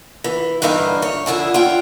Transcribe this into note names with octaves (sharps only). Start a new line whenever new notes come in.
E3
G2 D3 E3 D#4 E5 F5
C#5
F2 D3 E4 G#4
F4 C#5 E5 F#5 G5